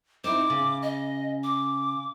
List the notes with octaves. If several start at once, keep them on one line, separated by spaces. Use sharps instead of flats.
C4 D#4 E4 D6
C#3
D#5
D6